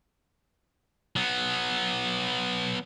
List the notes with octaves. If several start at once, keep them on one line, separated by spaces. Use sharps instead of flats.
F#3 B3